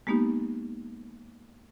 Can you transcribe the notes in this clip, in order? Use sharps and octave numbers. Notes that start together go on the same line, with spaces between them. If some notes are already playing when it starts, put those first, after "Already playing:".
G#3 A#3 B3 D#4 G4